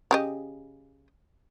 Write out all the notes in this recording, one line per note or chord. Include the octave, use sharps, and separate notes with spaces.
C#3 G4 D#5